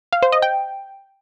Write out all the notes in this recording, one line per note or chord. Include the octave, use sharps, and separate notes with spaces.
F5
C5
D#5
G5